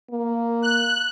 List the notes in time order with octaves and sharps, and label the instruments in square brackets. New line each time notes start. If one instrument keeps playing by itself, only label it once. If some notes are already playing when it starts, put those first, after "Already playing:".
[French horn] A#3
[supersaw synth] F#6